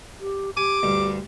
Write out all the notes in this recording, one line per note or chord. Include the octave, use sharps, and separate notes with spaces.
G4
G4 G#5 D6
D2 G2